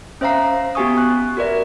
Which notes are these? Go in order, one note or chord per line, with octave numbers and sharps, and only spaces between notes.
C#4 C5 E5 F5 A#5 C7
B3 F#4 G4 G#5 C#6 D#6
C#6 F#6
F#4 A#4 B4 D5 E5